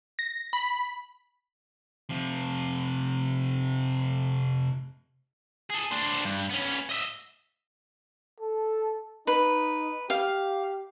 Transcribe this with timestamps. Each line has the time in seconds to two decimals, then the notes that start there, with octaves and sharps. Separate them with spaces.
0.19 A#6
0.53 B5
2.09 C3 F3
5.70 G#4 A4
5.91 D4 C5
6.25 G2
6.50 B3 C#4
6.89 D#5 E5
8.40 A4
9.27 D#4 B4
10.10 G4 F5